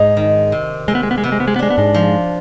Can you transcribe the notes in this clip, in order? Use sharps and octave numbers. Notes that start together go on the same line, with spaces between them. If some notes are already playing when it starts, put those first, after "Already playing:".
Already playing: G#2 G#3 D#4
D#3
C3
C3 G#3
B3
G#3
B3
G#3
C3 B3
G#3
B3
G#3
B3
G#3 D4
B3
G#2 G#3
F3